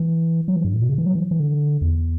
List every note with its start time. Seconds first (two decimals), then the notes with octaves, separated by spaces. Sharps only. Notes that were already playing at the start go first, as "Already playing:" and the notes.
Already playing: E3
0.48 F#3
0.56 E3
0.65 G2
0.74 A2
0.81 B2
0.89 C#3
0.98 E3
1.06 F#3
1.15 E3
1.31 E3
1.40 D3
1.81 E2